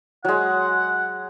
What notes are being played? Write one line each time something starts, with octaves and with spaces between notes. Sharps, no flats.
F#3 G#3 F#5